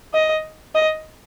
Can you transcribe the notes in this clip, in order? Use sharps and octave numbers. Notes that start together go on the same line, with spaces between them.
D#5
D#5